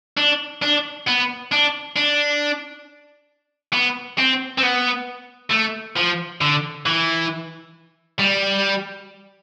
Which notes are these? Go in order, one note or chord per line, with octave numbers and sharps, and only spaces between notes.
D4
D4
B3
D4
D4
B3
C4
C4
B3
A3
F3
D3
E3
G3